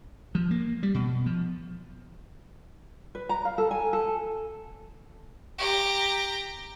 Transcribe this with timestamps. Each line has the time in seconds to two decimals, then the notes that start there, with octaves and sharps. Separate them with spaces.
0.35 F3
0.51 A#3
0.83 G3
0.94 B2
1.26 F3
3.15 B4
3.29 A#5
3.45 F5
3.58 A4
3.71 G#5
3.93 A4
5.58 G4 A#5